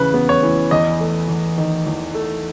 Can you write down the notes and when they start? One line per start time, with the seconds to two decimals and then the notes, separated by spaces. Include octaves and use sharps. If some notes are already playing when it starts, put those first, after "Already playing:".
Already playing: E2 C#3 E3 B4
0.14 B3
0.29 C#5
0.43 E3
0.71 E2 D#5
1.00 A3
1.28 E2
1.58 D#3
1.86 E2
2.15 A3